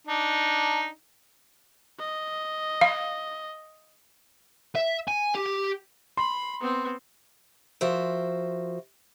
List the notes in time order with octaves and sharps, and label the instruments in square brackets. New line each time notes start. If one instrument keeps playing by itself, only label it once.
[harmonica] D4 D#4
[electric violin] D#5
[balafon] F5
[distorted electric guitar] E5
G#5
G4
[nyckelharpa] B5 [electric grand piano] C6
[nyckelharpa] B3 C4
[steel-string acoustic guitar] F3 F#4 A#4 C5 E5